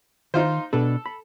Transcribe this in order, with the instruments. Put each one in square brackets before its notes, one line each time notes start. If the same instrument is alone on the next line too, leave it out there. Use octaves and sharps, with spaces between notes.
[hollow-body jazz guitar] D#3 [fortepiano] D#4 F4 C5
[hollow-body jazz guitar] B2 D4 B4 [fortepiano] A4
[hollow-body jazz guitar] B5